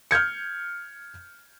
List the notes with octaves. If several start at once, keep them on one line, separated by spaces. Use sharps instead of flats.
F6 G6 G#6 C#7